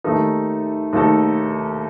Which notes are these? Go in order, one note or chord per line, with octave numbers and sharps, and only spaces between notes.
D#2 D#3 A3 D#4 A4
D#2 D#3 A3 D#4 A4